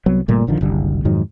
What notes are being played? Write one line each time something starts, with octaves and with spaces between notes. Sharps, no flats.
C2 F#3 B3
G1 A#2 G3 A3
A#1 D3 D#3 F3
F#1 C2 D3 G3
F2 G#2 D#3 F#3